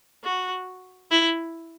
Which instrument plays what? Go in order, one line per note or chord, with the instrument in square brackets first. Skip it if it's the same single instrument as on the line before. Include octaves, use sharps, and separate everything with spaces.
[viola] F#4
E4